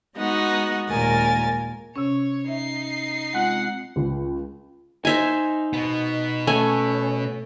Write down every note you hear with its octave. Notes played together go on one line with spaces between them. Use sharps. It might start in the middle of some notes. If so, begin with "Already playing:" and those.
G#3 B3 D#4 F#4
D#2 A#2 G#3 A#4 G#5 A6
C3 C#4 C#5
D#4 E5 C7
G#3 C4 F4 F#5
C#2
D#4 C5 E5 G#5
B2 B3
A3 C#4 G#5